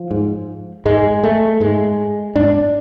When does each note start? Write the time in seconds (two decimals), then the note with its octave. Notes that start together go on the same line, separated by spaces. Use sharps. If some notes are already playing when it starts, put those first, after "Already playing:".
Already playing: F3
0.11 G#2
0.85 G#2 G#3
1.23 A3
1.60 G#2 G#3
2.36 G#2 D4